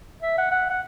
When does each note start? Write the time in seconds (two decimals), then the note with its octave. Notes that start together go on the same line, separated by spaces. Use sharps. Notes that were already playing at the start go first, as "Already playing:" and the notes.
0.22 E5
0.38 F#5
0.51 F#5
0.70 F#5